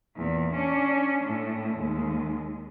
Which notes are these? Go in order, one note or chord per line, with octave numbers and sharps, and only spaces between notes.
E2 A#2
C#4 D4
A2
D#2 G#3